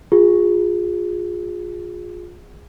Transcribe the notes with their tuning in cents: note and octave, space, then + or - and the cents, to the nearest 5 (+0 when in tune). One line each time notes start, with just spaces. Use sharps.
F4 +25 G#4 -15